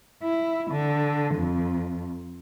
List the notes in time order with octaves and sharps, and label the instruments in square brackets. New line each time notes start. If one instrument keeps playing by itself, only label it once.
[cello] E4
D3
F2